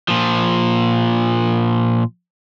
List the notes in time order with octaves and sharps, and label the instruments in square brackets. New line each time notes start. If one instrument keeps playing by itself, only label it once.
[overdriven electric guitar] A#2 F3